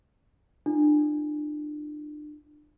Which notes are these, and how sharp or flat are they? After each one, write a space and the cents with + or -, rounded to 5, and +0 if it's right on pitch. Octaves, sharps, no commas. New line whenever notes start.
D4 +30 F4 -35